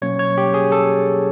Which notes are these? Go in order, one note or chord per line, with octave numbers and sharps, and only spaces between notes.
B2 F#3 A#3 C#4 C#5
C#5
G4
G#4
A4